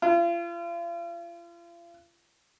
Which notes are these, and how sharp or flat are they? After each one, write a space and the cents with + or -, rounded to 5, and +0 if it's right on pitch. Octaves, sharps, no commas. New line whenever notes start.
F4 -40